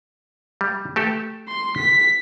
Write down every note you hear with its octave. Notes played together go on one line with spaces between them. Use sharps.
G3
A3 G4 A4
C6
B6